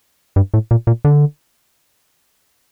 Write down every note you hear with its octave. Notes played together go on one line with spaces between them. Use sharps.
G2
A2
A#2
A#2
D3